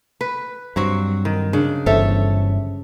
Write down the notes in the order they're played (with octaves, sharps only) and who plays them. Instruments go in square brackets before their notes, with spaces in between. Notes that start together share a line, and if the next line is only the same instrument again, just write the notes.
[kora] B4
[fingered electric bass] G2 [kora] F#3 C4 F#4
[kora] D#3
[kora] C#3 [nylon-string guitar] D4
[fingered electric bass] G1 G2 E3 [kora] A4 [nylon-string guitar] C5 C#5 E5